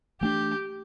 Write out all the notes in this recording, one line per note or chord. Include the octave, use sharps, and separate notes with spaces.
E3 A3 D4 G4